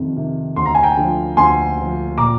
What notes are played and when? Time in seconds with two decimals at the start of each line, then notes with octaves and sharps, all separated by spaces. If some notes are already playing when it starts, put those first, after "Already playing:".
Already playing: F2 C3 D#3
0.17 C3 D#3
0.56 D2 C6
0.66 A#5
0.75 G#5
0.83 G5 A#5
0.97 D3 F3
1.37 D2 G#5 C6
1.77 D3 F3
2.18 A#2 A#5 D6